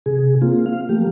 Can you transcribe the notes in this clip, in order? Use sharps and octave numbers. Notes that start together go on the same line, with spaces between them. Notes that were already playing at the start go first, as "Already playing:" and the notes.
C3 G#4
A#3 C4 F4
F5
F3 A3 A#3 G4